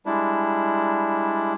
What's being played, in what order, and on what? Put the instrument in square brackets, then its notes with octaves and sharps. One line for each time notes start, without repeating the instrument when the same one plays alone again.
[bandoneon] G3 G#3 D4 E4